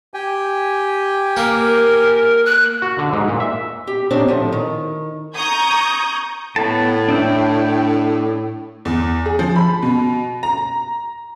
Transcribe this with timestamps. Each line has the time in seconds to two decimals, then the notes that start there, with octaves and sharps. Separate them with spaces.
0.14 G4 G5 G#5
1.37 A#3 A#4
2.45 F#6
2.82 F#4
2.99 D3
3.13 G#2
3.28 A#2
3.40 E5
3.87 G4
4.11 C4 D4 D#4 G4 C5 C#5
4.28 A2 D3 F3 F#3
4.52 D#3
5.35 A#5 C#6 D#6 G6 G#6
6.56 A2 B3 A5
7.09 D4 E5 G5
8.85 E2
9.26 G#4
9.39 F3
9.55 B5
9.83 B2
10.43 A#5